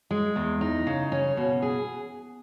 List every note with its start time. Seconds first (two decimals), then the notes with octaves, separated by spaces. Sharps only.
0.11 G#3
0.36 E2
0.61 D#4
0.87 C#3
1.12 C#4
1.37 B2
1.62 G#4